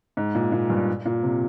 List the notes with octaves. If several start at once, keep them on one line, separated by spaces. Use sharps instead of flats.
G#2
A#2
A#2
G2
A#2
C3